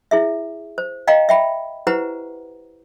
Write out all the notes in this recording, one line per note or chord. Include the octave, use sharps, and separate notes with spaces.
E4 G#4 E5
C5
D#5 F5 G5 A#5
E5 G5 B5
E4 G4 B4 C5 F#5 A#5